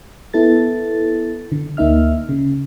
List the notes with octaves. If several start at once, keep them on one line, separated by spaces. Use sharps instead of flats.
B3 E4 A4 A6
D3
D2 A#3 D#4 E5 F6
C#3